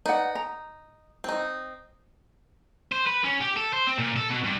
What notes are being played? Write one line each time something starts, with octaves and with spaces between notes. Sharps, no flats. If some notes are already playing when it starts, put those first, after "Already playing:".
D#4 B4 D5 F#5
A#5
C4 D#4
C5
B4
C#4
G4
A4
C5
C4
A#2
A4
B2
G2